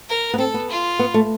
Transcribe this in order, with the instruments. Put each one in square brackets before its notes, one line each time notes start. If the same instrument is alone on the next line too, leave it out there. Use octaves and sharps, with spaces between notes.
[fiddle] A#4
[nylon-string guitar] B3
[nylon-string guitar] C4 [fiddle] A4
[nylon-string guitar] B3
[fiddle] F4
[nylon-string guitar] B3
A3